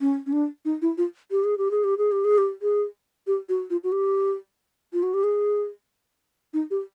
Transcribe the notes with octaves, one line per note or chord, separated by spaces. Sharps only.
C#4
C#4
D4
D#4
E4
F4
G4
G#4
G4
G#4
G4
G#4
G4
G#4
G4
G#4
G4
F#4
F4
F#4
G4
F4
F#4
G4
G#4
D#4
G4